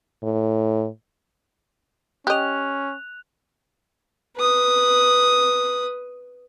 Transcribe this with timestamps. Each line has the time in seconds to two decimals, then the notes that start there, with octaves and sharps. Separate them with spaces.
0.23 A2
2.27 C#4 G4 D#5 F#6 F7
4.36 B4 D#6